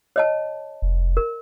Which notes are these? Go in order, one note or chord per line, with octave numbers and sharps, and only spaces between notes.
C#5 D#5 A5
F1
A#4